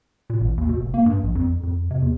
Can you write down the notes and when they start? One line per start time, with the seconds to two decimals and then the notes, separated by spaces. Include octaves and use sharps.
0.30 A#2
0.41 A1
0.57 D#2
0.69 B2
0.81 F1
0.94 A#3
1.06 G2
1.23 A#1
1.35 F2
1.63 F2
1.91 C3
2.02 E2